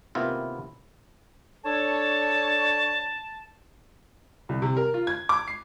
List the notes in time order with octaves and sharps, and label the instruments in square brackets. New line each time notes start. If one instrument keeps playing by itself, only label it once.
[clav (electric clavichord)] C3 D#3 A#3 B3 E4 F4
[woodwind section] D4 A4 C#5 [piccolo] A5
[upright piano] C2
C3
A#4
F4
G#6
D6
C7